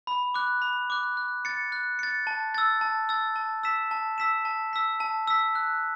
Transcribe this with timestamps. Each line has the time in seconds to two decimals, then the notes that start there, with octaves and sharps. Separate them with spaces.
0.07 B5
0.34 D6 F#6
0.62 B5
0.90 D6 F#6
1.17 F#6
1.45 A6 C#7
1.72 F#6
1.99 A6 C#7
2.27 A5
2.54 E6 A6
2.81 A5
3.09 E6 A6
3.36 A5
3.63 E6 B6 E7
3.91 A5
4.18 E6 B6 E7
4.45 A5
4.73 E6 B6
5.00 A5
5.27 E6 B6
5.55 F#6